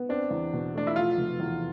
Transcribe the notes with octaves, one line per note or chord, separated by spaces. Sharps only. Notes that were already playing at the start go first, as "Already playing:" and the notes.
Already playing: B3
C4 D4
E2
B2
A3 D4
E4
F3 F4
F1
E2